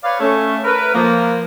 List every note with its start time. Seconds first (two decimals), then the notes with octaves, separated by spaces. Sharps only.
0.04 B4 C#5 D5 F5
0.20 A3 C#4
0.64 A#4 B4
0.95 F3 A#3